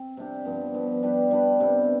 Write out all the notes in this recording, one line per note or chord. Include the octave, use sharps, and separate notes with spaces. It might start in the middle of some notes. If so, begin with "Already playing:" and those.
Already playing: C4
C3 G3 D4 G4
G2 F3 B3
G2 F3 B3
G3 D4 G4 B4
G3 D4 G4 B4
C3 G3 B3 E4